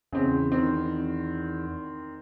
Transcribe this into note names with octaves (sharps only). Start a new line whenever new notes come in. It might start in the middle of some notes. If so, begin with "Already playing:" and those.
E2 C#3 C4
D#3 C4